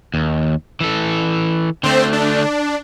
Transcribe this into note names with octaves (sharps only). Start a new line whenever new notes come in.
D#2
E3 A4
D3 A3 C4 C5
D4